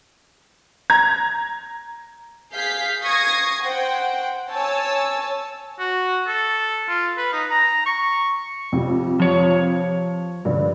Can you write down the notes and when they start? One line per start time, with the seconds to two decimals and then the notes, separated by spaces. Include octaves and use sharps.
0.90 A#5 G#6
2.53 G#4 F5 G6 B6 C7
3.03 C#6 D#6 G#6 A#6 C7
3.62 C5 F#5 G5
4.51 C#5 G#5 A5 E6
5.79 F#4
6.27 A4
6.88 F4
7.18 B4
7.33 D#4
7.51 A#5
7.86 C#6
8.72 F2 C3 G3
9.20 F3 C#5
10.45 G2 D3